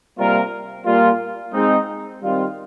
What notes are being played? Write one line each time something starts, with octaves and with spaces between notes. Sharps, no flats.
C3 G3 A#3 F4 A#4
A#2 G3 A#3 F4
G#3 C4 D#4
D#3 G3 C4 F4